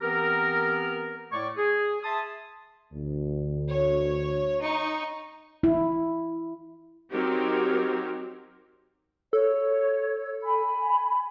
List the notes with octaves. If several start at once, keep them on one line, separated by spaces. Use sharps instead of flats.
E3 B3 C4 G4 A#4
A2 A3 D5 C#6
G#4
E5 A5 C6 D#6
D2
C#5
D#4 C#6
E4
F#3 C4 D#4 F#4 G4 A#4
A4 C#5
G#5 B5